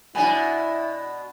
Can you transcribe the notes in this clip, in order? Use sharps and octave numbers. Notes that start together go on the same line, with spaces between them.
B2 D4 E4 C#5 G#5 B5